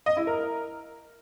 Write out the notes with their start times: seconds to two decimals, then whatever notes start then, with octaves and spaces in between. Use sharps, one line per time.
0.06 D#5
0.17 E4
0.27 A#4